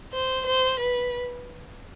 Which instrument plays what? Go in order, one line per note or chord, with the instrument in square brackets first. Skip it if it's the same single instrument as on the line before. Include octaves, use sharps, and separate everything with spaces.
[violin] C5
C5
B4